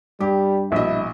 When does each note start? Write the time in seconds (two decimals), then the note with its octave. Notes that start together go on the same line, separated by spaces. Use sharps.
0.20 G2 G3 G4
0.72 A#1 B2 E4 D#5 E5